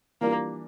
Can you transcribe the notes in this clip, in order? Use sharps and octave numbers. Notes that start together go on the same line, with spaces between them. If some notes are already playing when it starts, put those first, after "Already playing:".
E3 G3 A#3 D4 F4